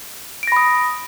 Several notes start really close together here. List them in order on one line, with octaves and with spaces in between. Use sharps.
D7 A#6 B5 D#6